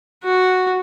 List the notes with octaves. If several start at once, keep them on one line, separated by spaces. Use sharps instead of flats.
F#4